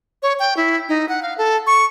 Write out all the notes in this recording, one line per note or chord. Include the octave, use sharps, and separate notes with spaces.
C#5
G5
E4
D#4
F#5
F5
A4
C#6